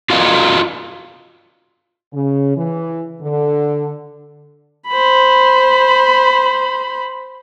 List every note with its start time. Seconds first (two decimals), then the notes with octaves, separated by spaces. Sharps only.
0.10 F4 F#4 D5 D#5 F5
2.14 C#3
2.57 E3
3.22 D3
4.88 C5 B5